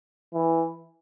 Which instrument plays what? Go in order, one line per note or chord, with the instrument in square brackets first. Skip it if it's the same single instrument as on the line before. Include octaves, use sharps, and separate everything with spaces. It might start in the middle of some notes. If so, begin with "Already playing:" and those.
[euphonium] E3